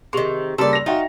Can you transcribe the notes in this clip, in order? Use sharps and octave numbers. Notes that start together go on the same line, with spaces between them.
C3 D#3 G#4 C6 C#6 F7
C#3 G3 A#3 A4 D5 A5 C6 E6
A#6 F7
D#4 F4 F#4 D#5 E5 G5